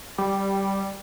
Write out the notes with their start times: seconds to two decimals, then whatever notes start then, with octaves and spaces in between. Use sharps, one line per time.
0.18 G3